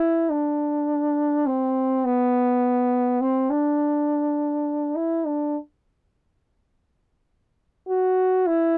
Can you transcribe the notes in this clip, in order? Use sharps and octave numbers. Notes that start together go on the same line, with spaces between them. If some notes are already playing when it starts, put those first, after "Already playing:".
Already playing: E4
D4
C4
B3
C4
D4
E4
D4
F#4
E4